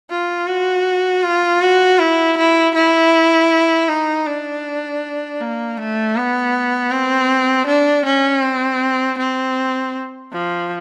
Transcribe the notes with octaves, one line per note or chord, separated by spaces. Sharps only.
F4
F#4
F4
F#4
E4
E4
E4
D#4
D4
A#3
A3
B3
C4
D4
C#4
C4
C4
F3